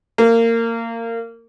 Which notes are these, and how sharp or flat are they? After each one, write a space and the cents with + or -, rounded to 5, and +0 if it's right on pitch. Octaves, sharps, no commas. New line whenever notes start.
A#3 -25